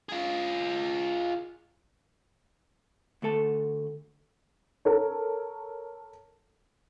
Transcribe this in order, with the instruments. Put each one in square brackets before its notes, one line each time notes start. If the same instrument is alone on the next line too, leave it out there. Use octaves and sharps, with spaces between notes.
[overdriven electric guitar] F4 G#4
[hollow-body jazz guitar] D2 A3 A4 A5
[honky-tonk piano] A4 A#4 C#5